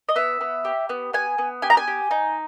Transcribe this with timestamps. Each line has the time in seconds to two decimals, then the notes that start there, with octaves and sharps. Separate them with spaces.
0.09 D#5
0.16 B3 E5
0.41 B3
0.65 G4
0.89 B3
1.13 B3 G#5
1.38 B3
1.62 G4 G#5
1.70 A#5
1.77 G#5
1.87 G4
2.11 D#4